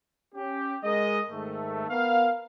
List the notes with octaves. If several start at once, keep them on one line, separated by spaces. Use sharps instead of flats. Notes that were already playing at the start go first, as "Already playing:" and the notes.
C#4 G4
G#3 A#4 D#5
G#2 D#3 A3
B3 A#4 F5